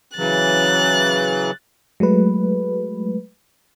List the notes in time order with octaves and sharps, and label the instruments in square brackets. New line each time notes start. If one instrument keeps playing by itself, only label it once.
[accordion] C#3 E3 F#3 [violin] F#6 A6
[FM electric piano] F#3 G#3 A3 B4